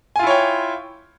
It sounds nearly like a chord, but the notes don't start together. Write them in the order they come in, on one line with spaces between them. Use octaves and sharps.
G#5 F4 E4 C#5 G5